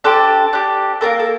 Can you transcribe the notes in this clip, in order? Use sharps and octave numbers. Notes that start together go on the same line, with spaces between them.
D4 G4 A4 C5
D4 G4
A#3 D4 A4 A#4
A4